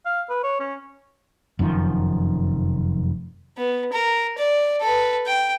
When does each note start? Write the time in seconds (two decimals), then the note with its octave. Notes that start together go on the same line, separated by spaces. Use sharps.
0.06 F5
0.30 B4
0.43 C#5
0.60 C#4
1.59 F1 F#2 D#3 F3
3.58 B3
3.93 A#4
4.38 D5
4.81 A4 B4
5.26 G5